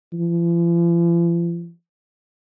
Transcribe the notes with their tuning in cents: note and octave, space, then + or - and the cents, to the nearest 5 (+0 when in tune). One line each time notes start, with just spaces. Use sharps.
F3 -45